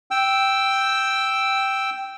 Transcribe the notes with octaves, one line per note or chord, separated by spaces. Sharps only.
G5 E6